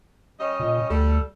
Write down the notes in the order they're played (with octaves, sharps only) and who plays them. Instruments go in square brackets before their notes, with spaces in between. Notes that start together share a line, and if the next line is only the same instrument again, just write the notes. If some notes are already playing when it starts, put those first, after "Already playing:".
[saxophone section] G3 C#4 D#5
[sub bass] A#2
[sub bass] D2 [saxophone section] G3 A4